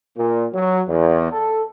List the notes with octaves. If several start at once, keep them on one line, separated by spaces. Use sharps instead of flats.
A#2
F#3
E2
A4